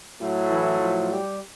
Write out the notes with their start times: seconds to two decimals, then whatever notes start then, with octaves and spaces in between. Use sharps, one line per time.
0.18 A2 F#3 A3
0.49 E3 E4
0.80 F3 F4
1.11 G3 G4